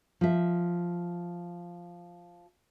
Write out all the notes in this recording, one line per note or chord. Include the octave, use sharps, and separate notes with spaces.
F3 E5